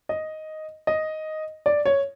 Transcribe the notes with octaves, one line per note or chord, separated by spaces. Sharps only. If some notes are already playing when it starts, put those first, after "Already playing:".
D#5
D#5
D5
C#5